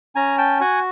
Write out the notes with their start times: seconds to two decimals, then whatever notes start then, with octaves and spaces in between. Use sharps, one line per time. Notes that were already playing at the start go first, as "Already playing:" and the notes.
0.15 C#4 G#5 A#5
0.38 G5 A5
0.61 F#4 F#5 G#5